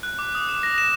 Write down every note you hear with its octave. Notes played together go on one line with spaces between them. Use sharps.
F#6
D6
D#6
E7
A#6
E7